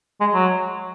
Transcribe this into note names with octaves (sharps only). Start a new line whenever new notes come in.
G#3
F#3